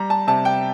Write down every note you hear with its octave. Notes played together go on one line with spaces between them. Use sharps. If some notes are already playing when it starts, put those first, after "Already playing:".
Already playing: G3 A#5
A5
C3 A5
G5